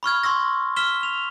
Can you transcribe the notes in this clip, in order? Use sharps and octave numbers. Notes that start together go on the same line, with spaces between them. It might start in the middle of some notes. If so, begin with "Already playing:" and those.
B5 C#6 F6 G#6
C6 C#6 E6 A#6
F6 B6 E7 G7
F7